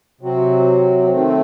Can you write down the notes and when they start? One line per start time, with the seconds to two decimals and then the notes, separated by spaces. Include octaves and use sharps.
0.21 C3 F#3 C4 F#4
1.10 D#3 A3 C4